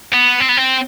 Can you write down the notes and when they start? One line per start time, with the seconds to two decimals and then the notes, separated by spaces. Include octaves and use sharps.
0.14 B3
0.40 C4
0.49 B3
0.57 C4